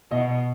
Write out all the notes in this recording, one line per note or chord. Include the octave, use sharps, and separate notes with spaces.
B2 D#5